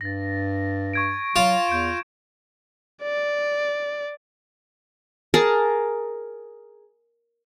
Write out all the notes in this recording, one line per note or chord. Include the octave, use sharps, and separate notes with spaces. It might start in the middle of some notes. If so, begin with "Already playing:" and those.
G2 A6 A#6
C#6 G#6 D7
F#3 F4 E7
E2 G6 D7
D5
G#4 A#4 A5 A#5